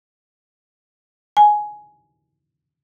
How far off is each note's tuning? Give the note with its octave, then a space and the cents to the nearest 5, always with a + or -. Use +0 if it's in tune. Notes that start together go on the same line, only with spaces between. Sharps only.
G#5 +10